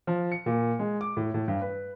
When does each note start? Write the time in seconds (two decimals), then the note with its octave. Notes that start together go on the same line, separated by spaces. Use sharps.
0.07 F3
0.32 C#7
0.46 A#2
0.79 G#3
1.01 D6
1.17 A2
1.34 A2
1.48 G2
1.61 B4